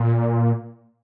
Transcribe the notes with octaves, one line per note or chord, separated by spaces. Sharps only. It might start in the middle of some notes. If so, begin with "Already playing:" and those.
Already playing: A#2